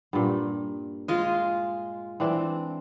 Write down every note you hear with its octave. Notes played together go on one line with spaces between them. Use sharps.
G2 A#2
G#3 F4 D#5
E3 C4 D4